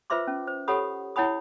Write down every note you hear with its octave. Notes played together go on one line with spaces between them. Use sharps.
F4 B4 C5 E5 C6 D6
C#4
C5
G4 A4 C#5 F#5 B5 D#6
E4 C#5 F#5 G#5 B5 D#6